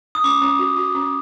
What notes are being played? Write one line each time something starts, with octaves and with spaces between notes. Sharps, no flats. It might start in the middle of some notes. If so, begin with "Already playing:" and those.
D#6
C#4 D6
C#4
F#4
F#4
C#4